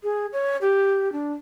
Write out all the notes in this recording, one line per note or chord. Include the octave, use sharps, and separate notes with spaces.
G#4
C#5
G4
D4